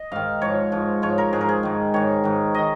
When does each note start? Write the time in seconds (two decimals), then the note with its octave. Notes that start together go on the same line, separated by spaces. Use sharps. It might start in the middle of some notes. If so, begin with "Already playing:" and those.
Already playing: D#5
0.12 G#2 D#3 F5
0.42 G#2 F3 C#5
0.72 G#2 F3
1.02 G#2 F3 C#5
1.18 A#4
1.33 G#2 F3 G#4
1.41 A#4
1.49 G#4
1.63 G#2 D#3
1.94 G#2 D#3 C#5
2.24 G#2 D#3
2.55 D#3 D#5